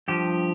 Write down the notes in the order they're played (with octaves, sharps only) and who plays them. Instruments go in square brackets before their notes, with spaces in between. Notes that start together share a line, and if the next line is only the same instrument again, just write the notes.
[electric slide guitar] G2 F3 G4